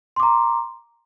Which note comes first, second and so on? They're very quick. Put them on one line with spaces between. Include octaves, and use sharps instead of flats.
C6 D6 A#5